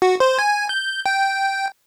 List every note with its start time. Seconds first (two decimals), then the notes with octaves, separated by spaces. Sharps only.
0.02 F#4
0.20 C5
0.39 G#5
0.69 G6
1.06 G5